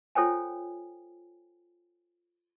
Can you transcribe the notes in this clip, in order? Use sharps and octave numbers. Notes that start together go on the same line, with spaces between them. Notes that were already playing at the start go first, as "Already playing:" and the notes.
F4 A4 C5 C#5 G5 G#5